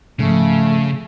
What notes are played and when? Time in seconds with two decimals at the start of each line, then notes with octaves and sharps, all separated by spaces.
0.19 G#2 C#3 F3 A3